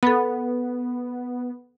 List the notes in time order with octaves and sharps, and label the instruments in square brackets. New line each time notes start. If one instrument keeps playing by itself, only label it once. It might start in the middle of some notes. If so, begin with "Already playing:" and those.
[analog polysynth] B3 [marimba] A4 B5